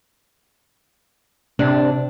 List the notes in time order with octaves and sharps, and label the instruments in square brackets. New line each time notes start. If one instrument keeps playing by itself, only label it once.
[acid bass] C3 [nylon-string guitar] D4